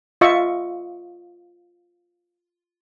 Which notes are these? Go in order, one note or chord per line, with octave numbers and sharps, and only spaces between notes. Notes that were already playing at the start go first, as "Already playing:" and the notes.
F4 D#5 E5 C#6